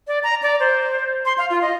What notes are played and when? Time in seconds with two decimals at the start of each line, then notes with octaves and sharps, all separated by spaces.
0.07 D5
0.23 A#5
0.42 D5
0.60 C5
1.25 C6
1.38 F5
1.50 F4
1.62 D#5